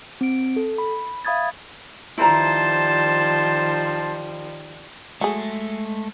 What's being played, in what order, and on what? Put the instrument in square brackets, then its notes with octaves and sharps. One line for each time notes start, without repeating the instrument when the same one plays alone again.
[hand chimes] C4 D7
A4
B5
E5 F5 B5 D#6 G#6 A6
[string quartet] D#3 F3 G3 [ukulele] E4 B4 A#5 [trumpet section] C5 A5
[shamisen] F#3 G#4 [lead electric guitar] G#3 [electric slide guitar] A3